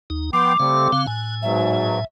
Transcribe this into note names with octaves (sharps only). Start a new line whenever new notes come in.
D#2 D#4
F3 B3 G5 C6 D6
C#3 G3 A3 C4 F5
C#3 C4 F5 F#6
A2 G#5
G#2 B2 F#3 E5